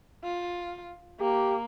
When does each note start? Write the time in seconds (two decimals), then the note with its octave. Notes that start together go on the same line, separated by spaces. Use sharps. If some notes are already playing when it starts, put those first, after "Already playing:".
0.24 F4
1.20 A#3 G4